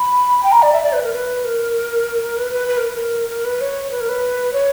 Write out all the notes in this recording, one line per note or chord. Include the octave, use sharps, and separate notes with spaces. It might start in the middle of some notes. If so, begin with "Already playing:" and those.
Already playing: B5
G5
A#5
D5
E5
D5
B4
A#4
B4
A#4
B4
B4
B4
A#4
A#4
A#4
B4
C#5
B4
A#4
B4
C#5